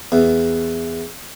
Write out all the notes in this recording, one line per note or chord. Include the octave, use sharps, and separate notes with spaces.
E2